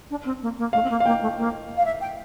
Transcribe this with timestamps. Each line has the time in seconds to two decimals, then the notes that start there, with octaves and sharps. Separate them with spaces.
0.10 D4
0.25 C4
0.42 A#3
0.58 A#3
0.73 A3 F5
0.83 C4
0.90 A#3
1.00 F5
1.06 A#3 G5
1.21 A3
1.38 A#3
1.77 F5
1.85 E5
2.01 G5